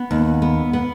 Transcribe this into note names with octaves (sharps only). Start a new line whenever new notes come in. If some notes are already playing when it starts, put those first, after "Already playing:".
Already playing: B3
D#2
B3
B3